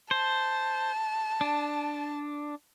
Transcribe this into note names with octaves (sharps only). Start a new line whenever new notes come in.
C5 A5
D4